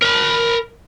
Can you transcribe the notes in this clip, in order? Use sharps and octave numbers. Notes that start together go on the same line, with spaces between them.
A#4 B5